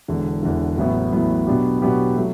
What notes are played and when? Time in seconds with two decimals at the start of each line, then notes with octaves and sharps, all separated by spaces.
0.08 E1 E2 D3
0.43 E1 E2 D3
0.78 A1 A2 F#3 B3
1.13 A1 A2 F#3 B3
1.47 B2 F#3 B3 D4 G4
1.82 B2 F#3 B3 D4 G4
2.16 F#3 A3